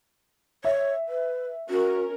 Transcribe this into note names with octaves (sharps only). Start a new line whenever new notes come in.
C#5 E5
B4
C#4 F#4 A#4